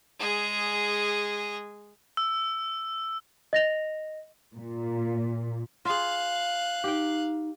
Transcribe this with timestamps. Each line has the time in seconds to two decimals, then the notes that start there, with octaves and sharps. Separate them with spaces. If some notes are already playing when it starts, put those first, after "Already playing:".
0.19 G#3 G#4
2.17 E6
3.53 D#5 A#6 F7
4.55 A#2
5.85 F4 G#4 F5 F#6
6.84 D#4 G4 G5